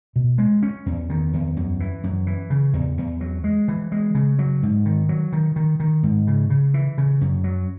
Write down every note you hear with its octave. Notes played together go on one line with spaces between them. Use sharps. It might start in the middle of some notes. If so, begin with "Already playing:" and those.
B2
G#3
C#4
E2
D#3
E2
F#2
E3
F#2
E3
C#3
E2
E2
F#3
G#3
E3
G#3
C#3
F#3
G#2
D#3
F#3
D#3
D#3
D#3
G#2
C#3
C#3
E3
C#3
F#2
F#3